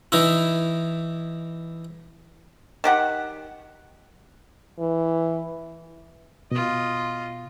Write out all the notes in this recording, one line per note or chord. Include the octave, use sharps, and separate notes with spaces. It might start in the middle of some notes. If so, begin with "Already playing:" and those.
E3 D#4 E4
D#3 G4 F#5
E3
B2 F4 D#5